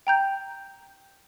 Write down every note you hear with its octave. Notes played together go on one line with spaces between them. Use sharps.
G5 A#5 G6